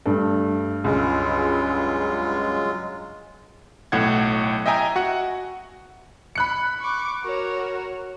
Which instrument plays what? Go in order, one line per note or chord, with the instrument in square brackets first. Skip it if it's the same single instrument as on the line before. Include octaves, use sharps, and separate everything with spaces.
[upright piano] G2 [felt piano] A3
[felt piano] C#2 [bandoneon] F#3 G#3 F4
[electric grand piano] B1 A2 F#5 G#6
D#5 E5 G5 G#5 A#5
F#4 F#5
[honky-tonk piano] B5 F#6 C#7
[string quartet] C#6 D6
F#4 A#4 C#5